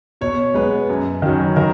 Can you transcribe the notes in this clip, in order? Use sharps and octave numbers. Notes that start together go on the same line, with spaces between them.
B2 C#5
G#3 B3 B4
F#2
D#3 F#3 C#4
D#3 A#4